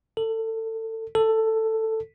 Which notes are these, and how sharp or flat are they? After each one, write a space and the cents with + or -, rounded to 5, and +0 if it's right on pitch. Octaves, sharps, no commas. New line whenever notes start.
A4 +25
A4 +10